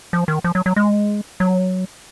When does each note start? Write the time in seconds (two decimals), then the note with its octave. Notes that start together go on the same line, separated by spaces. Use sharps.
0.13 F3
0.28 D#3
0.44 F3
0.55 F#3
0.66 F#3
0.76 G#3
1.40 F#3